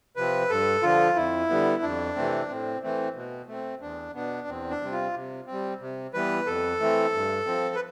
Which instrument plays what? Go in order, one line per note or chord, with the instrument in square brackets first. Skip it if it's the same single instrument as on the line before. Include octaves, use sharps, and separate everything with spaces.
[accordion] C3 F3 C4 B4
G2 A4
D3 F3 F4
F2 E4
D3 G3 B3
F2 D4
C3 E3 A3 C4
A2 C4
E3 A3 C4
B2
A3 C4
E2 D4
B2 B3 D4
E2 C4
D4
C3 G3 C4
F4
C3
C4
G3
C3
E3 G3 B3 B4
F2 A4
E3 A3 C4
G2
F3 C4
B4